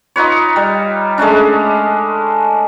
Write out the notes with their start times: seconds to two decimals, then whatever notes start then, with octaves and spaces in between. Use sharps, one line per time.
0.16 D#4 F4 B4 C#5
0.56 G3
1.18 G#3 A3 C#4 D4